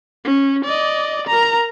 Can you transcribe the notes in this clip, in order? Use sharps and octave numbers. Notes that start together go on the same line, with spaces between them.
C#4
D5 D#5
A#4 A#5